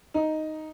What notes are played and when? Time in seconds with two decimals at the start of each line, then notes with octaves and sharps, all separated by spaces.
0.14 D#4